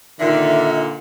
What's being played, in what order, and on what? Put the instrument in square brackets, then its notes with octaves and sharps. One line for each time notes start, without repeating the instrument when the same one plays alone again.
[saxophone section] A#2 D3 [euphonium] D#3 [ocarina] E5